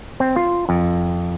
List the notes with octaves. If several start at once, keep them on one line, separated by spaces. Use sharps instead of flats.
C4
F4
F2